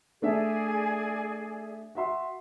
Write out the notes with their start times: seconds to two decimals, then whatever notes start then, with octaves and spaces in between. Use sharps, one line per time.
0.22 A3 D4 G#4 D5 E5
1.95 F#4 E5 C6